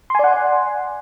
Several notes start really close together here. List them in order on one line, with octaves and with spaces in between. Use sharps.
C6 G#5 D5 F#5